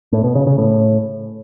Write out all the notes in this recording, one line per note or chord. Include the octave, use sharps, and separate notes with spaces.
A2
B2
C#3
C#3
A2